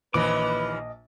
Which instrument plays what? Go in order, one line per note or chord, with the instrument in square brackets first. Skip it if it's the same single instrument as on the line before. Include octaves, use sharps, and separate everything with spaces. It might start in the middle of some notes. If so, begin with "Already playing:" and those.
[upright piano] A#1 [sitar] D#2 E3 F3 [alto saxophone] B4 [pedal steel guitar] D#5 D6